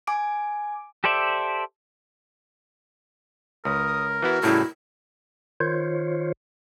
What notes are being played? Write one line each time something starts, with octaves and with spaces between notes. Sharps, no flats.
G#5 D6 D7
G4 A4 C5 D5 E5
C#2 A#4 D#6
E3 B3 E4 F#4
A2 C#3 G3 E4
D#3 F4 C5 C#5